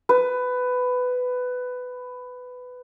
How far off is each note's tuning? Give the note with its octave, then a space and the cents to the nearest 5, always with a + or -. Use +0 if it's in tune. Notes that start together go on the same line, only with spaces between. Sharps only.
B4 +15